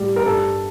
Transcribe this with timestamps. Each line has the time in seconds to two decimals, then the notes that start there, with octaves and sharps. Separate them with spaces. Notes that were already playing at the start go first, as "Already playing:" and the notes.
Already playing: A2 G3
0.16 A#4
0.26 G2 A4